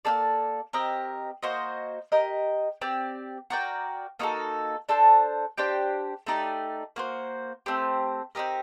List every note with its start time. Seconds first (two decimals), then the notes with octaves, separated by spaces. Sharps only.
0.05 A#3 D#4 A4 D5
0.73 C4 G4 A#4 D#5
1.43 A#3 F#4 C5 D#5
2.12 G4 A#4 D#5
2.81 C4 G4 D5
3.50 F#4 A#4 D5 G5
4.19 A#3 D#4 F#4 A4
4.89 D4 A4 C5
5.58 D4 G4 C5 G5
6.27 A3 D#4 G4 D5
6.96 A#3 F#4 C5
7.66 A3 C4 G4 C5
8.35 C4 D#4 G4 A#4